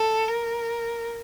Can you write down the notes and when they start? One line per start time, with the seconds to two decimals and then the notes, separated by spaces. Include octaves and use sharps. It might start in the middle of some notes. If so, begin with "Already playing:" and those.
Already playing: A4
0.28 A#4